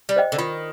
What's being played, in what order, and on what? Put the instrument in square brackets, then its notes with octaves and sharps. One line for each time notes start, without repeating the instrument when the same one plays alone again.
[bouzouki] G3
[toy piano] C5 D#5 G5
[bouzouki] D3
[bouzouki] D#3 [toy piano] F4